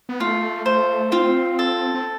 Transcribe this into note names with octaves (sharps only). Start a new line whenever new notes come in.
B3
A3 F4
A3 C5
C4 F4
A4
C4